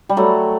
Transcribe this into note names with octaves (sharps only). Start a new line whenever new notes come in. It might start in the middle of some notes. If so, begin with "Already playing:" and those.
G3
F#3 A3